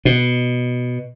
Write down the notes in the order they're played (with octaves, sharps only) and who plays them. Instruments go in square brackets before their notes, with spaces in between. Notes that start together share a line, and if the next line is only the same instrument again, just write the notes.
[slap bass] B2